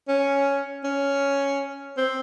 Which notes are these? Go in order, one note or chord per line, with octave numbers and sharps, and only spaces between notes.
C#4
C#4
C4